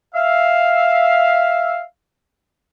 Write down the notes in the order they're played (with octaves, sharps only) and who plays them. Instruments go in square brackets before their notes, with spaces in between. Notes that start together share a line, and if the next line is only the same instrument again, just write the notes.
[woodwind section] E5 F5